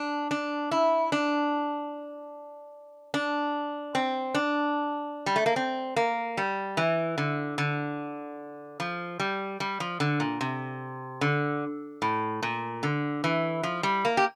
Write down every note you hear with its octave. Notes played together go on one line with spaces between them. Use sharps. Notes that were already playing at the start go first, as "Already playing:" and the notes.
Already playing: D4
D4
E4
D4
D4
C4
D4
G3
A3
A#3
C4
A#3
G3
E3
D3
D3
F3
G3
G3
F3
D3
A#2
C3
D3
A2
A#2
D3
E3
F3
G3
A#3
G4